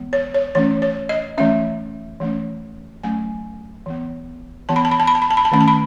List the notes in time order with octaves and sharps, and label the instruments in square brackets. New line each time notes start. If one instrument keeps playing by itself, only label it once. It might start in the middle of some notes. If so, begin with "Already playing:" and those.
Already playing: [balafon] E3 G#3 B3
C#5
C#5
E3 A3 C#4 C#5
C#5
D#5
E3 A3 C#4 E5
E3 A3 C#4
F#3 A3 C#4 G#5
E3 B3
E3 B3 A5
B5
A5
B5
A5
B5
A5
B5
A5
B5
A5
D#3 A3 C#4 B5
A5
B5